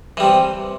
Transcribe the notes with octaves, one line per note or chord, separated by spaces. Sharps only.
C3 E3 G3